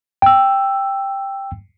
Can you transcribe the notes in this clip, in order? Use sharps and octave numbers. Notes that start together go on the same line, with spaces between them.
G5 E6